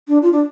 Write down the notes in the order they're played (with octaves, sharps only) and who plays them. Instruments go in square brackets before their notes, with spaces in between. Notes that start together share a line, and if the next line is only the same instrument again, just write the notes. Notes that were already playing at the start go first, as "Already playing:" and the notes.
[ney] D4
F4
D4